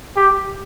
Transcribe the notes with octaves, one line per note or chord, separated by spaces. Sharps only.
G4